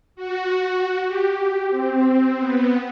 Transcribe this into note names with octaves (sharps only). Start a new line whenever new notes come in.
F#4
G4
C4
B3